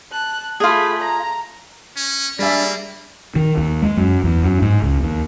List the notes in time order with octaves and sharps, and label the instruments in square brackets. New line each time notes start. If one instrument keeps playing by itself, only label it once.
[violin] A5 F#6
[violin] A3 B5 [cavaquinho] F4 G#4
[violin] A#5
[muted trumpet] C#4
[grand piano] G3 G#4 E5 [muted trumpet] A#3 [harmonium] D4 D5
[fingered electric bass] D#3
D#2
G#3
F#2
E2
F#2
G#2
C#2
D#2